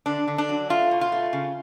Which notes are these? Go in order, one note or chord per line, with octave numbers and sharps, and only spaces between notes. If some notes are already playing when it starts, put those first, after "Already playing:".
D3 D4
D3
D4
F#3
A3 F4
B2
F4
A3
C#3